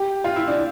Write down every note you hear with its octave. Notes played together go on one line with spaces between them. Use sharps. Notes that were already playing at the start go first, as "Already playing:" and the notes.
Already playing: G4
F4
E4
D4